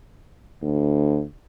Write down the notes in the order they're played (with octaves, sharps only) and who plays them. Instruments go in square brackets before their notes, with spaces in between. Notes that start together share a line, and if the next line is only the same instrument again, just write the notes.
[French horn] D2